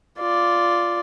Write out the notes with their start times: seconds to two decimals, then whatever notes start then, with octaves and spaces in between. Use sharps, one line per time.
0.19 F4 D5